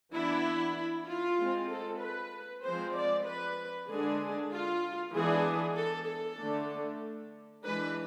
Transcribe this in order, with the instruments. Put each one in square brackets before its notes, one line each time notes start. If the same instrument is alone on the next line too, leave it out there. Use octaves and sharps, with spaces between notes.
[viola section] E3 B3 D4 E4
F4
G#3 C4
A4
B4
F3 G#3 C4 C5
D5
B4
D3 G#3 D4 G#4
F4
E3 G#3 B3 D4 G#4
A4
A4
D3 A3 D4
E3 G#3 D4 B4